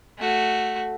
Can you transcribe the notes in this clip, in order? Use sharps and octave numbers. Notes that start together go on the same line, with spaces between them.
A3 F#4